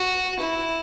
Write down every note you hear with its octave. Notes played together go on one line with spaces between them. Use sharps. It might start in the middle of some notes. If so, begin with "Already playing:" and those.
Already playing: F#4
E4